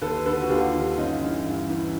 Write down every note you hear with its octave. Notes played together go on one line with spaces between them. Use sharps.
D#2 A4 B4
D3 A4 B4
F#4
D#2 F4 G4
D3
G2 C#4 D#4
E3
G2
E3